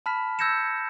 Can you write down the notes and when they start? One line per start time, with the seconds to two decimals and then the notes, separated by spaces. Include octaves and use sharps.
0.06 A5 B5 F6 B6 E7
0.39 E6 G6 G#6 A#6 C#7 E7